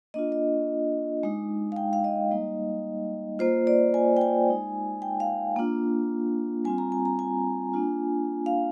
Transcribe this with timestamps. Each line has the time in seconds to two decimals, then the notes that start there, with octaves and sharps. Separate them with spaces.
0.14 A#3 D4 F4 D#5
0.32 D#5
1.23 G#3 D#4
1.72 F5
1.76 G5
1.93 F5
2.04 D#5
2.31 G3 A#3 D#4
3.39 A#3 F4 C5
3.67 D5
3.94 G#5
4.17 G5
4.21 G#5
4.49 G#3 D#4
5.02 G5
5.20 F5
5.56 A#3 D4 F4
6.65 G3 C4 F4 G#5
6.78 A#5
6.92 G#5
7.05 A#5
7.19 G#5
7.73 A#3 D4 F4
8.46 F5